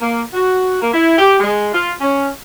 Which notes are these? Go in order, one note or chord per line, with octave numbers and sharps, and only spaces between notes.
A#3
F#4
A#3
E4
G4
G#3
F4
C#4